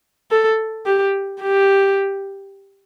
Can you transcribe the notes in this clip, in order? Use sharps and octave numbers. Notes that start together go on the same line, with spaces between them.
A4
G4
G4